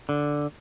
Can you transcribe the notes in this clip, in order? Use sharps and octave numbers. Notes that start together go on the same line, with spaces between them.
D3